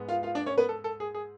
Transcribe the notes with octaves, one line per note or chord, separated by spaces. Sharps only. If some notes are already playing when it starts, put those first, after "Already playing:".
Already playing: G#2 G#3 B3
F4 F5
F4 F5
D4 D5
C#4 C#5
B3 B4
A4
A4
G#4
G#4